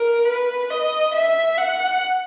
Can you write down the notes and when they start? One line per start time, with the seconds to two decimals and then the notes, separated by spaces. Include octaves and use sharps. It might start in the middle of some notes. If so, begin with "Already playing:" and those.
Already playing: A#4
0.25 B4
0.70 D#5
1.14 E5
1.58 F#5